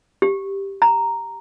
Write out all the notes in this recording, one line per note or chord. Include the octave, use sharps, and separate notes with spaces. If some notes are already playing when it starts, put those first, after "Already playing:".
G4
A#5